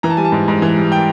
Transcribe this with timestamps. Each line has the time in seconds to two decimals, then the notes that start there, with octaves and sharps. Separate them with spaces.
0.03 E3 A#5
0.10 A5
0.17 G3 G#5
0.25 A5
0.32 G#2
0.48 G#2
0.62 E3
0.76 G3
0.92 G5